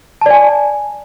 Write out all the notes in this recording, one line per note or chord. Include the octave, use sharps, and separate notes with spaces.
D5 G#5 A5